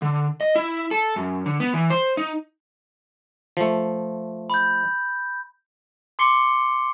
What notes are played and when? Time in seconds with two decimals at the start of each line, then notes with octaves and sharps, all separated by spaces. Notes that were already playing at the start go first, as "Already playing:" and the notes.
0.02 D3
0.41 D#5
0.56 E4
0.91 A4
1.16 F#2
1.46 D3
1.60 B3
1.74 E3
1.90 C5
2.17 D#4
3.57 F3 A3
4.50 B5 G6
6.19 C6 D6 C7 C#7 G7